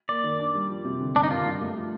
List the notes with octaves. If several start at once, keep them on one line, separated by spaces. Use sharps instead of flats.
A#3 D5
D#3
D4
G3
F3
C3
D3
G2 D4
D#4
D#3 F4
G2
A3
F3